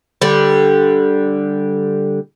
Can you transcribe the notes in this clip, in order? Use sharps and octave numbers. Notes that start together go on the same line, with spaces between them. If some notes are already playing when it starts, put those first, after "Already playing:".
D3 G3